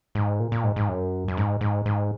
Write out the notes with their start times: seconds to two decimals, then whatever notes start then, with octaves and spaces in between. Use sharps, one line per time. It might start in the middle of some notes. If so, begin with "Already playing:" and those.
0.15 G#2
0.40 A#2
0.52 A#2
0.64 G#2
0.76 G#2
0.89 F#2
1.28 F#2
1.37 G#2
1.61 G#2
1.86 G#2